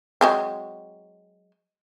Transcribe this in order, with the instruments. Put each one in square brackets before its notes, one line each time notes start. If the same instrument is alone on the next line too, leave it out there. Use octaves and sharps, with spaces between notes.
[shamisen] F#3 G#3 C4